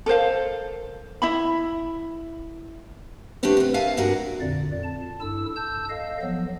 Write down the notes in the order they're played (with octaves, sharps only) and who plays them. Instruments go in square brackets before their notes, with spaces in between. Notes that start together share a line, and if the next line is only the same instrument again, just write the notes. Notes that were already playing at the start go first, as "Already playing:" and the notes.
[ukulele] A4 A#4 C5 F5
E4 E5 B5
[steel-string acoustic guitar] A3 B3 C4 D4 G4 B4
C3 B4
A#4 E5 F5 G#5 A5
G2 D4 F#4 A#4
[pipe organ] F2 A#2 D3 D5
A5
G2 E4 A4 E6
A5 E6 G6
A4 D#5 F5
F3 F#3 B3